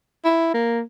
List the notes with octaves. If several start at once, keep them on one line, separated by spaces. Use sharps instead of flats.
E4
A#3